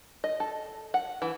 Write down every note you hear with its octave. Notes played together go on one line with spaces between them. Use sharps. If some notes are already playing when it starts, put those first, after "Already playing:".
D#5
A4
F#5
E3